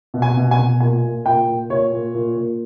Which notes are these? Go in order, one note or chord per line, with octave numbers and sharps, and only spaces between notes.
B2
G#5
B2
G#5
B2
A#2 G#5
A#2
A#2 G5
A#2
A#2 C#5
A#2
A#2
A#2